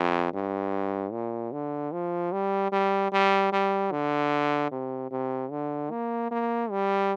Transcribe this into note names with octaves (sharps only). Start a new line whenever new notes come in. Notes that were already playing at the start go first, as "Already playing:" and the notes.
Already playing: F2
G2
A#2
D3
F3
G3
G3
G3
G3
D3
C3
C3
D3
A#3
A#3
G3